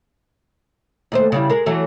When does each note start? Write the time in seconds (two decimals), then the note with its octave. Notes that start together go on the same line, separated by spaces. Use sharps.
1.12 D#2 A3 C5
1.32 C#3 G3 E4
1.50 G#3 A#4
1.66 E3 F#3 A3